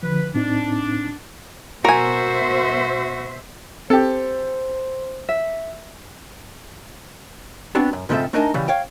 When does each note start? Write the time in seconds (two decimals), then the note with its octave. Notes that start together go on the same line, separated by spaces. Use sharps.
0.03 D3 F3 B4
0.35 A2 C4 D4 D#4
1.85 B2 F#4 A#4 C5 E5 G#5
3.90 C4 G4 A4 C5
5.29 E5
7.75 B3 C4 D4 F#4
7.93 F#2
8.09 G#2 C#3 F3 C4 A4 E5
8.33 A3 D4 D#4 A#4 G#5 A5
8.54 C#3 E3 G3
8.68 C#5 F5 G5